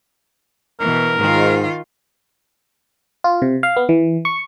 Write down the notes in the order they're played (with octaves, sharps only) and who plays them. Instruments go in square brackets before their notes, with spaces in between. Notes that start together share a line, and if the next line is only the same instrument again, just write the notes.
[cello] B2 E3 [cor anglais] A#4
[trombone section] G#2 [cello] D#3 F4
[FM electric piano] F4
C3
F5
B3
E3
C#6